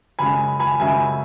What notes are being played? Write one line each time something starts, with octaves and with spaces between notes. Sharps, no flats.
F#2 C#3 G#3 G#5 B5
G#5 B5
F#2 C#3 G#3 E5 G#5